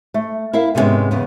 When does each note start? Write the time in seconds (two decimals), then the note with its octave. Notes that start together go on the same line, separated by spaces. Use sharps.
0.14 A3
0.53 E4 A#4 E5 F5
0.75 G#2 C3 G3 G#3 B3 C#4
1.11 E2 C#3 B3